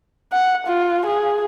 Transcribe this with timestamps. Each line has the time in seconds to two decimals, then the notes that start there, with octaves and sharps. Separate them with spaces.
0.33 F#5
0.67 F4
1.06 G#4